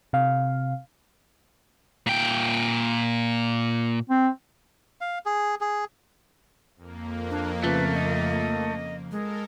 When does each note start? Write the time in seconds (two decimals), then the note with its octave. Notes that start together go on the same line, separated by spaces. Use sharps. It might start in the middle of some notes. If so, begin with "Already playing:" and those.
0.13 C3 F5
2.07 A#2 G5
4.10 C4
5.01 F5
5.26 G#4
5.61 G#4
6.76 F2 A#3
7.30 D4
7.64 C#3 F3 A3 B4
7.95 D#5
9.11 G#3 A4 A#4